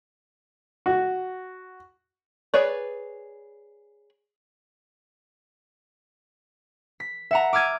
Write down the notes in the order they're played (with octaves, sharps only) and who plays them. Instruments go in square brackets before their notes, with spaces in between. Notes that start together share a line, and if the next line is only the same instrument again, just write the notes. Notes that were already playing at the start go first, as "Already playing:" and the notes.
[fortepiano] F#4
[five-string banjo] G#4 B4 C#5 D5
[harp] B6
E5 F#5 A#5
D6 E6 F6 G#6 D#7